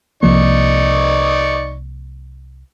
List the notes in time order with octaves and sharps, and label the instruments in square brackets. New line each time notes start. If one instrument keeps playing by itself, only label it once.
[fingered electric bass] C2 F3 A#3 [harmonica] D#4 D5 C#6